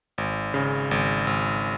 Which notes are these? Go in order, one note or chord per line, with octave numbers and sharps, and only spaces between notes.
G#1
C#3
G#1
G#1